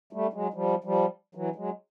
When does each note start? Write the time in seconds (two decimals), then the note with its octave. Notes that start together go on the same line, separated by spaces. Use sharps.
0.13 G3 A3
0.33 F#3 G#3
0.53 F3 G3
0.84 F3 G3
1.35 E3 F#3
1.56 F#3 G#3